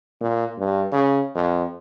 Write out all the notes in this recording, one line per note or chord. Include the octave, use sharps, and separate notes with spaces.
A#2
G2
C#3
F2